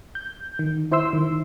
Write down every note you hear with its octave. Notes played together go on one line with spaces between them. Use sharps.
G6
D#3
E4 C5 E5 C6 E6
D#3